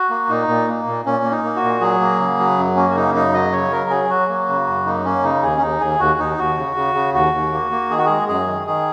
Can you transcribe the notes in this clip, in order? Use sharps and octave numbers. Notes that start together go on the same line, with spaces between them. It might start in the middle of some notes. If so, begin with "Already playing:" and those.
Already playing: F#4
A#3
A#2 D#4
A#2
A#3
A#2
A#2 C#4
A#3
D#4
A#3
F#4
A#2
F#3 G#4
A#3
C#3
F#3
F#2
A#3 C#4
F#4
C#3 D#4
F#2 D#4
F#3 D#5
C#3 C#5
F#3 A#4
F#3 G#4
F#3 F#4
A#3
C#3
F#2
A#3 D#4
A#3 C#4
C#3 D#4
D#2 G#4
C#4
D#2 D#4
D#2 G#4
D#2 F#4
D#2 D#4
D#2 F#4
C#3
C#3
C#3
D#2 F#4
D#2
A#3
A#3
D#3 G#4
F#4
G#3 G#4
F#2 G#4
D#3
D#3 G#4